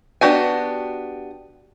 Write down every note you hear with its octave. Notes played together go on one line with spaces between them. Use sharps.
B3 D4 F#4 G4 G#5